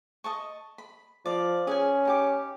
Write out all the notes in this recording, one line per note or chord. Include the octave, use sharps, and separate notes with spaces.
D#5 A5 C#6
B5
F3 D5 F5
C#4 G#4 B4 G#5
D#4 G4 D6